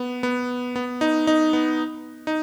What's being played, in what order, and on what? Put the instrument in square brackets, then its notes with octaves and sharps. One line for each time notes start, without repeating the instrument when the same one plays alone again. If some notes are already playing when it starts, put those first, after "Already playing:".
Already playing: [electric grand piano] B3
B3
B3
D#4
D#4
B3
D#4